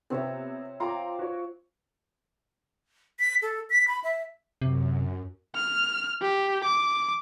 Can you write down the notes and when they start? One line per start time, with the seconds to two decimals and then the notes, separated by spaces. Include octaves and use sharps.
0.10 C3 B3 C4 C#5 E5
0.80 F4 G5 A#5 C6 D6
1.19 F#4 C#5
3.20 B6
3.42 A4
3.70 B6
3.88 B5
4.04 E5
4.62 F#2 C3
5.56 F6
6.21 G4
6.65 D6